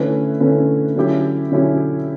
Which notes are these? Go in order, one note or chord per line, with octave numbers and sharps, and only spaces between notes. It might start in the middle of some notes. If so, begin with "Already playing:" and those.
Already playing: D3 A3 C#4 E4 B4
D3 A3 C#4 E4 B4
D3 F#3 C#4 E4 G4
D3 F#3 C#4 E4 G4